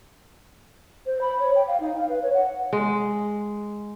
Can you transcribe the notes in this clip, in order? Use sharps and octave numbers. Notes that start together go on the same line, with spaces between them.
C5
B5
C#5
G5
F5
D#4
F5
B4
C#5
F#5
G#3